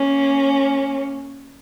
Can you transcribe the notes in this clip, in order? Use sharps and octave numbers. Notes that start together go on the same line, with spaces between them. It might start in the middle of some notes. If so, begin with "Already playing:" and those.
Already playing: A#3 C#4